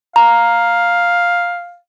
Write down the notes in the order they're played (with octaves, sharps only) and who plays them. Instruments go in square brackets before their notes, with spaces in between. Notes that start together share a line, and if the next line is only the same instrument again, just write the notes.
[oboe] F5 [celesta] A#5